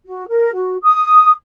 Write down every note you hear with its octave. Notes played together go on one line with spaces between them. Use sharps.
F#4
A#4
F#4
D#6